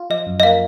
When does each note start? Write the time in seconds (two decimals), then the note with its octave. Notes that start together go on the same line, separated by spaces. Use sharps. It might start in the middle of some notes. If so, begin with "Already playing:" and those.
Already playing: F4
0.10 F3 D#5
0.27 F#2
0.40 D#5
0.43 A#3 F5